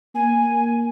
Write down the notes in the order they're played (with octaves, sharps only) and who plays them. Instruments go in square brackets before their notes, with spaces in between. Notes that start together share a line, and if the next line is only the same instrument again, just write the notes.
[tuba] A#3 [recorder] G#5